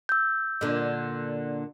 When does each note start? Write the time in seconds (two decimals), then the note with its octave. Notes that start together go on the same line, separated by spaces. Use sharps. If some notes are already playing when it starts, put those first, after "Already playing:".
0.09 E6 G6
0.61 A#2 D3